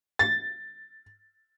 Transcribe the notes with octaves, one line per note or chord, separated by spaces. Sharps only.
A6